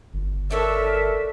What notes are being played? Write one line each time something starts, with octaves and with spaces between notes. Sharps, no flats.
G1
D4 A4 A#4 C#5 E5